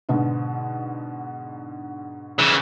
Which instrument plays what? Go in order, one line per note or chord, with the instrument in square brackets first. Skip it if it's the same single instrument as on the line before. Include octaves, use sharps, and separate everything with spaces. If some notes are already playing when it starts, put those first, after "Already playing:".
[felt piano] G#2 B2 D3
[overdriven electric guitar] C#3 E3